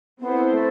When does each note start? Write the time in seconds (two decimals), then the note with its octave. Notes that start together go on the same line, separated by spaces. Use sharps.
0.20 B3 C4 E4 A4 C5
0.51 A3